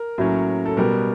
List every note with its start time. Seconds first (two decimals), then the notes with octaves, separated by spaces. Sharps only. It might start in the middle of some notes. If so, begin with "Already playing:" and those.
Already playing: A#4
0.18 A2 F#3 A#3 C#4
0.66 A4
0.77 B2 G3 B3 A#4